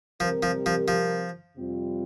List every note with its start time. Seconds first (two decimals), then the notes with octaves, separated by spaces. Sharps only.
0.20 C3 F3 G3 C4 G4 A#4
0.43 F3
0.66 F3
0.88 F3
1.56 F2 C3 G3 C4 F4